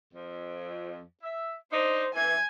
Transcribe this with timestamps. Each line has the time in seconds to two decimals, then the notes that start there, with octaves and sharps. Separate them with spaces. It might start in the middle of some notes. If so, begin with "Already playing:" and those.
0.13 F2
1.22 E5
1.72 D4 D#4 C5
2.15 E3 G#5 G#6